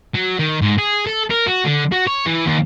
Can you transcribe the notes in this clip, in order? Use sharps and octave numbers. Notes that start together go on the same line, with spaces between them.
F#3
D#3
G#2
G#4
A4
A#4
F#4
D3
F#4
C#5
E3
D#2